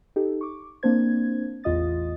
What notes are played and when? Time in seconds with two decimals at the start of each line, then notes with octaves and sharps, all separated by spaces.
0.16 D#4 G4 A4
0.41 C#6 D6
0.83 A#3 C4 D4 C5 G#6
1.64 A1 E2 F4 D#5 D#6 A6